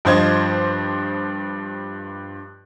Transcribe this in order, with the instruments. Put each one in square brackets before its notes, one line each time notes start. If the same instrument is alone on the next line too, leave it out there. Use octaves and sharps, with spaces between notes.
[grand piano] G2 F3 C5 D#5 G#6